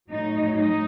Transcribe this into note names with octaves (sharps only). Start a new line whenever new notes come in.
A2 F#3 D#4
D#4